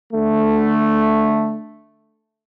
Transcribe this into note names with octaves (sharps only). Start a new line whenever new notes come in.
D3 A3